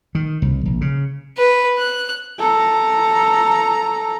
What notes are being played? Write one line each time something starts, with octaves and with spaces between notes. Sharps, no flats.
D#3
C2
A#1
C#3
B4
F#6
A4 A#5